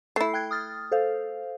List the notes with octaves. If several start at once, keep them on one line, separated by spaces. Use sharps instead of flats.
A3 E4 C7
G5 F#6 G#6
D#6 F6 A6
A4 C5 F5